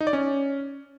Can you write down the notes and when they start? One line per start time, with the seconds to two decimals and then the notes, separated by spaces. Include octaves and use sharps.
0.01 D#4
0.07 D5
0.13 C#4